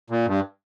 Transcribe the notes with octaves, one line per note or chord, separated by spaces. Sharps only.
A#2
G2